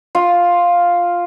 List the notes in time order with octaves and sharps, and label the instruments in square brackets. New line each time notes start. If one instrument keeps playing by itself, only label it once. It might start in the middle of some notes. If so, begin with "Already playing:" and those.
[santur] F4